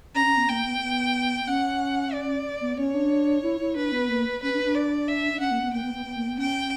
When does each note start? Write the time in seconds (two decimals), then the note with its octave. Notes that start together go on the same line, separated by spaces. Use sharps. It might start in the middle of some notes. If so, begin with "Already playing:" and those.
0.15 C#4 A#5
0.26 C#4
0.37 B3
0.48 A#3 G5
0.65 B3
0.81 B3
1.47 C#4 F#5
2.13 D5
2.61 B3
2.77 C#4 C#5
2.94 D4
3.43 E4
3.60 E4
3.76 D4 B4
3.92 B3
4.09 A#3
4.42 C#4 B4
4.53 D4
4.63 D4
4.75 D5
5.08 E5
5.33 D4
5.40 C#4 F#5
5.51 A#3
5.62 B3
5.73 A#3 G5
5.83 B3
5.94 B3
6.06 B3
6.16 A#3
6.28 B3
6.38 C#4 G5